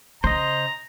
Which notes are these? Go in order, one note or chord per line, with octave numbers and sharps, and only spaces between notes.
C#3 C5 D#5 A#5